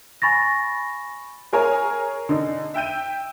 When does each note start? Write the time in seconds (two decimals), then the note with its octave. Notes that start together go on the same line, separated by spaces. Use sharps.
0.22 G#5 B5 C#6 A6 A#6
1.53 G#4 A#4 C#5 G#5
2.29 D3 D#4
2.74 E5 G5 G6 D#7